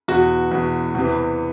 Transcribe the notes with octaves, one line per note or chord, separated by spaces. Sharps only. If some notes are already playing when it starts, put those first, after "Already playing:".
E2 B2 F#4
E2 B2
E2 C3 E3